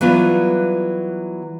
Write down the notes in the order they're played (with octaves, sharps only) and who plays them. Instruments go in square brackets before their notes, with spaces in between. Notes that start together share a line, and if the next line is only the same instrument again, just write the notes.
[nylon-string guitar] E3 F#3 G3 B3 F4